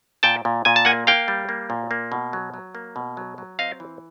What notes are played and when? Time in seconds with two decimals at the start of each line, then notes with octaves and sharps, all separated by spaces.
0.23 A#2 G5 A5
0.45 A#2
0.65 A#2 G#5
0.76 A5
0.85 A#3 F#5 G#5
1.07 A#3 F5 G5
1.28 G3
1.49 A#3
1.70 A#2
1.91 A#3
2.12 B2
2.33 F#3
2.54 F#3
2.75 A#3
2.96 B2
3.17 F#3
3.38 F#3
3.59 C4 D#5 F5
3.80 E3